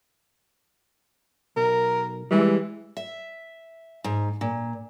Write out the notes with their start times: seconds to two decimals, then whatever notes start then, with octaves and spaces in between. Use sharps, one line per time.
1.56 B1 A#4
2.31 E3 G3 G#3
2.97 E5
4.04 G#2
4.41 A#2